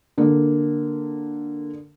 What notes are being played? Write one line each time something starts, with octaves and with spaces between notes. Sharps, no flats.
D3 A#3